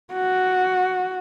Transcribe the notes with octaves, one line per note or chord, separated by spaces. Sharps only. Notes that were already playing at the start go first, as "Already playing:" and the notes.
F#4